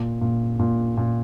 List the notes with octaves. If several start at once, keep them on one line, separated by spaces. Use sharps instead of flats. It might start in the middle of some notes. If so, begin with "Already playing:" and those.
Already playing: A#2
A#2
A#2
A#2